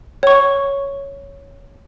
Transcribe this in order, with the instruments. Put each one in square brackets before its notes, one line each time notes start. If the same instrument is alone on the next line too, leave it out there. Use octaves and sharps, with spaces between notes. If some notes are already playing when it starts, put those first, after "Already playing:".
[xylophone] C#5 C#6